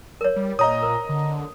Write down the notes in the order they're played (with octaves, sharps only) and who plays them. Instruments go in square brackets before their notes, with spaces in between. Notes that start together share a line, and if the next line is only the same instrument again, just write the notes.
[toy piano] A#4 C#5
[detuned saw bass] G3
[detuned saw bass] A#2 [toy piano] C#5 [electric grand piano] D#5 A#5 D#6
[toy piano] A#4 C5
[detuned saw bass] D3